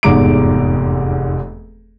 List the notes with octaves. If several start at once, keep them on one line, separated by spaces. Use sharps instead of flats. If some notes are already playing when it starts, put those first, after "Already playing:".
F1 E2 G#2 A#5 D6 D7